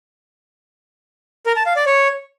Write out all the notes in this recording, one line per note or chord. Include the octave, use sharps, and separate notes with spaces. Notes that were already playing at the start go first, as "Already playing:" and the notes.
A#4
A5
F5
D5
C#5